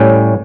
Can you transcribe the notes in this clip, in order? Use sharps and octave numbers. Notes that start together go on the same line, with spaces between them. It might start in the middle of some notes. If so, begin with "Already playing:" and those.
Already playing: A2 G3 C#4